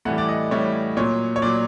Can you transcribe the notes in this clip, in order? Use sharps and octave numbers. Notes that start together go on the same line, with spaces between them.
A2 E3 G3 F#5
D5
D#5
A2 E3 G3 C#5
A#2 F#3 C#5
C#5
A#2 F#3 D5